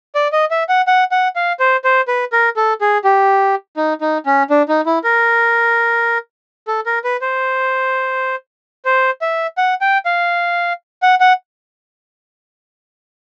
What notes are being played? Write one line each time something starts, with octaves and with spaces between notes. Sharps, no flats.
D5
D#5
E5
F#5
F#5
F#5
F5
C5
C5
B4
A#4
A4
G#4
G4
D#4
D#4
C#4
D4
D#4
E4
A#4
A4
A#4
B4
C5
C5
E5
F#5
G5
F5
F#5
F#5